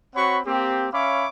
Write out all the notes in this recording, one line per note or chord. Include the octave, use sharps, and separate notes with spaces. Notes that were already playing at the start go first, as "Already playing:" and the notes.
C4 F#4 C#5 F#5 B5 C#6
A#3 C4 G4
C#4 C#5 E5 F5 B5 D6